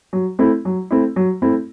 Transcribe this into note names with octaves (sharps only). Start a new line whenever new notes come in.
F#3
A3 C4 E4
F#3
A3 C4 E4
F#3
A3 C4 E4